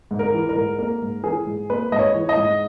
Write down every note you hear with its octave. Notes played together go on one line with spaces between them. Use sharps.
G#2
A#4
E3
A#4
G#2
A#3 A#4
G#2
E3 G#4
G#2
A#3 B4
G#2 D#5
C#5
E3
D#5
G#2